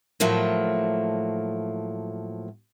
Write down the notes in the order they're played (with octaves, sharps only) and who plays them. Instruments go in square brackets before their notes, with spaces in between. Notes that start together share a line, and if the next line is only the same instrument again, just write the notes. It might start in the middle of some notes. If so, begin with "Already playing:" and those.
[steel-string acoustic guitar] A2 F3 F#3 A3 A#3